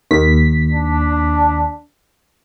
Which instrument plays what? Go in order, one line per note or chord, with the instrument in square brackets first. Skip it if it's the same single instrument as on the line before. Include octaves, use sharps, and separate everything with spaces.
[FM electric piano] D#2 B6
[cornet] D4